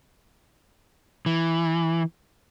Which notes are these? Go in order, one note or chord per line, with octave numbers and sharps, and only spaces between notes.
E3